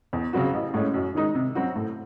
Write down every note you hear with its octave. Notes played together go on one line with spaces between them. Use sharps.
E2
C#3 F#3 C4 F#4
A1
A2 G#3 C#4
F#2
D#3 G#3 D#4
C3
F#3 C4 F#4
A2